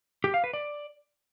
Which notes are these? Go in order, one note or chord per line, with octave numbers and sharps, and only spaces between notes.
G4
F5
B4
D5